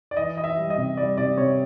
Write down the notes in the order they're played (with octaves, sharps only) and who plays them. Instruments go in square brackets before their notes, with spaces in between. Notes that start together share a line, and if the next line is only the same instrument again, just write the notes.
[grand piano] D5
E3 D#5
E3 D#5
E5
G3
D#5
C3
G3 D5
C3 D5
C3 C#5